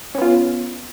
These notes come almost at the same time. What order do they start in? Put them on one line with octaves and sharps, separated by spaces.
C#4 B3 F4